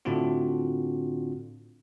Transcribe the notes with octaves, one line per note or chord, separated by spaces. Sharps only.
A2 D3 C4 D4 F4 F#4